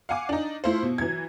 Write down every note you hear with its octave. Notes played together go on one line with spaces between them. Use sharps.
F5 F#5 G#5 D6
D4 D#4
A3 E4 F4 C5
B2
E3 F#3 G#6